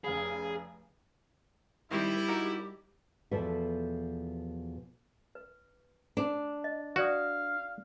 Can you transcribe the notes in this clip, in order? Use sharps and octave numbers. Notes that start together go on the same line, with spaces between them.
F1 C#3 G#4 B5
D#3 G3 C4 E4 G4
D#4 F#4 A#4
E2 B2 F3 A4 B4 E5
B4
D4
D#5
F#4 B4 D5 F5 D#6